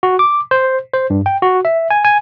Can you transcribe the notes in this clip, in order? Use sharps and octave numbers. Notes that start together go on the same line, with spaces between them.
F#4
D6
C5
C5
G2
G5
F#4
E5
G#5
G#5